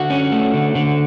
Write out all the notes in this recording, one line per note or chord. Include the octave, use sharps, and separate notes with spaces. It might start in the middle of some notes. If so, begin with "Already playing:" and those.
Already playing: D3 F#4
C#4
A3
D3
D3